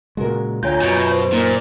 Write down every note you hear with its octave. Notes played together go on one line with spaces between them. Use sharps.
A#2 C#3 G#3 F#4 A#4
D2 D3 F4 C#5 G5 G#5 A#5 G6
F#2 B2
C5
A#2 D#4 A#4